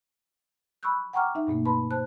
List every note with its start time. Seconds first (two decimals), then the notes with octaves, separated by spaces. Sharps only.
0.83 B5 C#6 E6 F#6 G6
1.13 F#5 G5 A#5 C#6 D6 F6
1.35 D#4 E5
1.47 G2 B2 A3 A#3
1.65 B4 A5 B5 C6
1.91 C5 A5 F#6